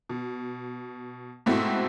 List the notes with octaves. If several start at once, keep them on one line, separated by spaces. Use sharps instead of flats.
B2
G#2 B2 A3 C4 E4 F#4